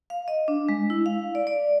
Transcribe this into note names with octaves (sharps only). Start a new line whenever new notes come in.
F5
D#5
D4
G#3
E4
F5
D5
D5